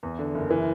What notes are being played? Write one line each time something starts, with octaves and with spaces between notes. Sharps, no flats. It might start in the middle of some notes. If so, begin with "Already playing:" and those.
E2
D3
F#1
E3